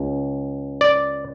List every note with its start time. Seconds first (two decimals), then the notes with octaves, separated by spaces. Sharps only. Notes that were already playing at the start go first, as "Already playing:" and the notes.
Already playing: C#2
0.81 D5